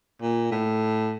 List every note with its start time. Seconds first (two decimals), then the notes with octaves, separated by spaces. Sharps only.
0.21 A#2
0.52 A2